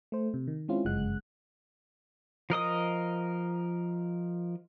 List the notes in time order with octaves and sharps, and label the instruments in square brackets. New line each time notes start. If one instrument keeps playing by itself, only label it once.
[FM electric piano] A3 C5
C3
D#3
G#3 C4 C#4 E4 F4
G1 F#2 C#3 G#3 F#5 F#6
[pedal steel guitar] F3 A#4 D#5 D#6